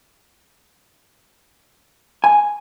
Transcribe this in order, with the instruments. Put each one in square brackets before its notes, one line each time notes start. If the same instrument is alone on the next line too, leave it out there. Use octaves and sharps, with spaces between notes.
[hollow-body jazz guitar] G#5